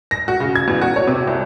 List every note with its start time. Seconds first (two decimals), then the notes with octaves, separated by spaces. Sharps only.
0.11 A#6
0.28 F#4
0.40 C#3
0.55 G#6
0.68 E2
0.82 F#4
0.96 C#5
1.07 C3
1.27 C2